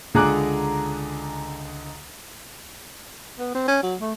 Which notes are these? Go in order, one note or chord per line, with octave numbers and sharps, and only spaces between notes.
C#2 D3 G#4 A#5 D6 F#6
B3
C4
C#4
F#3
A3